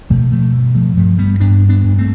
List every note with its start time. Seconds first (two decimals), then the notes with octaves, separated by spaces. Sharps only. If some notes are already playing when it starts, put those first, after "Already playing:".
0.10 B2 F3 A3
0.32 F3 A3
0.53 G2
0.75 F3 A3
0.97 G2 F3 A3
1.18 G3 B3
1.40 G2 B3 D4
1.69 B3 D4
1.84 G2
1.98 A3 C4